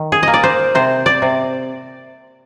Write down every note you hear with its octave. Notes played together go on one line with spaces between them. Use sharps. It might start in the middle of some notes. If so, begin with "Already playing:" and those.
Already playing: D#3
G#4
A#3 D#5
D5
C5
C3 C5
D5
C3